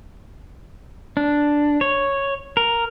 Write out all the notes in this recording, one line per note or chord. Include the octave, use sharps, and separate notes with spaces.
D4
C#5
A#4